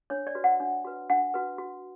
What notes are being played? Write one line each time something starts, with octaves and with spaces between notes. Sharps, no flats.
D4 C#5
D5
F#4 B4
F#5
D4
F#4 B4
D4 F#5
F#4 B4
F#4